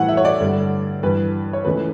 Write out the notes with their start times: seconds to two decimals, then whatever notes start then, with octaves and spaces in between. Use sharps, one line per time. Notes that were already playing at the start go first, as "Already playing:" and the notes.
Already playing: A2 E3 G3 F#5
0.08 E5
0.17 C#5
0.25 D5
0.39 G2 D3 G3
1.03 G2 E3 G3 B4
1.53 C#5
1.64 C#2 C#3 E3 A3 B4